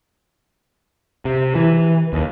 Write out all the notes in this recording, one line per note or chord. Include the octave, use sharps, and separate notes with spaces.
C3
E3
D#2